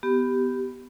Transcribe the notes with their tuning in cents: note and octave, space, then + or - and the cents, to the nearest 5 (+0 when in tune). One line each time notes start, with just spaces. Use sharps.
B3 +10 G4 -10